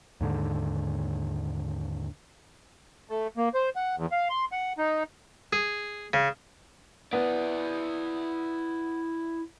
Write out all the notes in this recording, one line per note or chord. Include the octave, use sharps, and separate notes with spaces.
D#2 G#2 D3
A3
A#3
C5
F#5
E2
F5
C6
F#5
D#4
G#4
C#3
B3 E4 D5